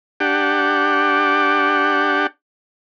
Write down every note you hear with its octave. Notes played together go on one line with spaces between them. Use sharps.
D4 G4 F#5